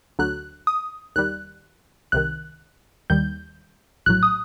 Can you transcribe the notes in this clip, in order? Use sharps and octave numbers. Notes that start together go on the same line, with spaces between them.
D2 D3 F#3 F#6
D#6
D#2 D#3 G3 F#6
C2 C3 D#3 F#6
D#2 D#3 G3 G6
A#1 A2 F#3 F#6
D#6